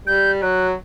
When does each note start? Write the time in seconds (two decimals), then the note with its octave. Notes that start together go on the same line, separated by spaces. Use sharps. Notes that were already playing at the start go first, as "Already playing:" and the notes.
0.07 G3 G6
0.42 F#3 F#6